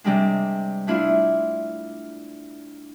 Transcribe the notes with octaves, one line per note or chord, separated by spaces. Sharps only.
C3 G3 G#3 D4
A3 D4 E4 F4